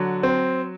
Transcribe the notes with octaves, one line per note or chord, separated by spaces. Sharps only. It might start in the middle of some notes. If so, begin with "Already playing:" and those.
Already playing: D3 F#3
C4